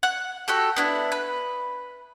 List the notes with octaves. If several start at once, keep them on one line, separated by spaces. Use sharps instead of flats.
F#5
F#4 G4 A4
B3 D4 E4
B4